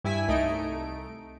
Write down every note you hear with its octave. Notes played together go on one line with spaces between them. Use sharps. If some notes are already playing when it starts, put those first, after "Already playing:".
G2 E4 G#5 B6
C2 A3 D#4 D7